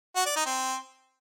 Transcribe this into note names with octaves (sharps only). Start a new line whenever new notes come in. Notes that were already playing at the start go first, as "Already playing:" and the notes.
F#4
D5
D#4
C4